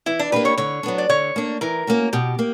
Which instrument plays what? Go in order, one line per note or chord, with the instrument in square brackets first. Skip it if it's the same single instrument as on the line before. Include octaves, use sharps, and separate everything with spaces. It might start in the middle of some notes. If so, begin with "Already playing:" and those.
[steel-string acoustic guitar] E3 [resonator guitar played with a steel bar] E4
[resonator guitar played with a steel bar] D4
[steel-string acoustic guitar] A#3 D4 G4 [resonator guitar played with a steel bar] B4
[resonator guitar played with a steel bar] C#5
[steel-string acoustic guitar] D3 [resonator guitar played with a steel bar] C#5
[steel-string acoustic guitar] F#3 B3 D4
[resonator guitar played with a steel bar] D5
[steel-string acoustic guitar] D3 [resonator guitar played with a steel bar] C#5
[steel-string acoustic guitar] A#3 D4
[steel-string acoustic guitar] E3 [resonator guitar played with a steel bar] A#4
[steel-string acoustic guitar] A#3 C#4 F#4
[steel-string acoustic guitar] B2 [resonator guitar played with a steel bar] G4
[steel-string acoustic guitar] A#3